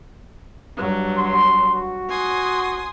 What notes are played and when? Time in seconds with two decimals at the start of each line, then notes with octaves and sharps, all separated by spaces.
0.77 G2 F#3
1.17 C6
1.74 F#4
2.09 G#5 C6 D#6